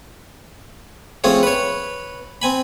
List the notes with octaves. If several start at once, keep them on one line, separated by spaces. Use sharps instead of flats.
F3 A3 C4 C#4 G#4
B4 C#5
C4 G#5 B5